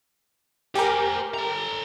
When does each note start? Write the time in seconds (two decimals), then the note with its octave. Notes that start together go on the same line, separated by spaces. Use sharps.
0.75 G4 A#4 C5 G#5
1.34 A4 A#5